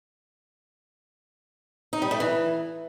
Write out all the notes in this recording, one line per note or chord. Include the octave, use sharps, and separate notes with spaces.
D#4
G3
A3
E3